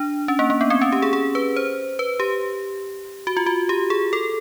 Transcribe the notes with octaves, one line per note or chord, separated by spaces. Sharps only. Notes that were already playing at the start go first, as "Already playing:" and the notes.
Already playing: D4
C#4
A#3
A#3
B3
C4
C#4
G4
G#4
G#4
B4
C5
B4
G4
F#4
F4
F#4
G4
G#4
A4